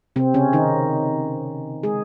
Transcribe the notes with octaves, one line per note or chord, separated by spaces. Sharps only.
C3 C4
C#3 C#4
D#3 D#4
G#3 G#4